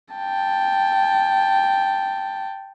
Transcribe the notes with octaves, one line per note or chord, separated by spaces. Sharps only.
G5 A5